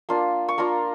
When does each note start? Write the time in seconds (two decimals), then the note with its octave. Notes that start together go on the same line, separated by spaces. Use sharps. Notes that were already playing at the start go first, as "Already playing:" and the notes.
0.09 A#3 D4 F4
0.49 C#6
0.58 A#3 D4 F4 A#5